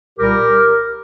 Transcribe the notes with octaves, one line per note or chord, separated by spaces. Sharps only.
C2 A#2 G3 G4 A#4